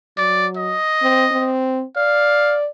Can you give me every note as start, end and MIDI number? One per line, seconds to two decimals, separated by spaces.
0.18 0.75 54
0.18 0.47 74
0.57 1.52 75
1.02 1.26 60
1.31 1.83 60
1.96 2.68 74
1.96 2.56 77